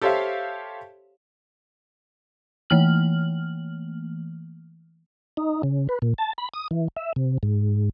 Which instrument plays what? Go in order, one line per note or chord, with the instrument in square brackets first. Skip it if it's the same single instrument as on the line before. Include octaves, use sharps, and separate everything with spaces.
[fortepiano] G4 A4 C5 C#5 E5 F5
[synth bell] E3 A3 A#3 F6 F#7
[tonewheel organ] D#4
C#3
B4
A#2
A5
B5
D#6
E3
E5
C3
G#2